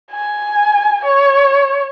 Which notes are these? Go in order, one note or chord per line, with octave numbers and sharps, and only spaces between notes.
G#5
C#5